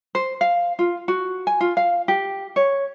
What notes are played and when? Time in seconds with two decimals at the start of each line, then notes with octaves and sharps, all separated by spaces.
0.15 C5
0.41 F5
0.79 F4
1.08 F#4
1.47 G#5
1.61 F4
1.77 F5
2.08 G4
2.56 C#5